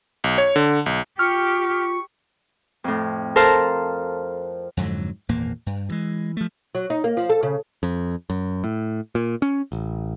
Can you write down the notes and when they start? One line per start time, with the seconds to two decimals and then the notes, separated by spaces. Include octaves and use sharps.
0.24 B1
0.38 C#5
0.56 D3
0.86 B1
1.19 F4 G4 C#6 F6
2.84 F2 A2
3.36 A4 A#4 C5 F5 A5 A#5
4.77 F2 G#2 D3 F#3
5.28 G#1 E2 A#2 A#3
5.66 G2
5.89 G2 E3 G#3
6.37 F3 A3
6.75 F#3
6.90 D#4
7.04 A#3
7.17 F3
7.30 A4
7.43 C#3
7.83 F2
8.30 F#2
8.64 A2
9.15 A#2
9.42 C#4
9.72 A1